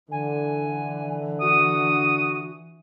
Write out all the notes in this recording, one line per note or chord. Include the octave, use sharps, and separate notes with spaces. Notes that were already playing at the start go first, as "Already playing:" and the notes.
D3 E3 G#5
F#4 D#6